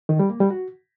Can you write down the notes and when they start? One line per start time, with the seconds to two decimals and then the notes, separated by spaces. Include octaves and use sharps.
0.09 D#3
0.19 G3
0.30 A#3
0.40 G3
0.50 F#4